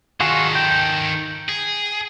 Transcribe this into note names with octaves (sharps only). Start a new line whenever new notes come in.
D#3 F4 F#4 G#4 A4
G5
G#4